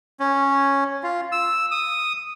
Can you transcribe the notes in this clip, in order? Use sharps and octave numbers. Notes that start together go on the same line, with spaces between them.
C#4
F4
E6
D#6